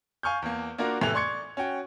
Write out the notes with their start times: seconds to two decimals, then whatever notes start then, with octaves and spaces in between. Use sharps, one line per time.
0.23 F5 G#5 C#6 F6 G6
0.42 E2 A#3
0.78 A#3 D4 F4 F#4 A#4
1.01 A2 C3 E3 A3 F#6 F7
1.14 D5 C6 C#6 G#6 C#7
1.57 C#4 F#4 G5